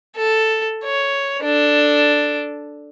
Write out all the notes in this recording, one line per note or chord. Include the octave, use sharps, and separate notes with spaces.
A4
C#5
D4 A4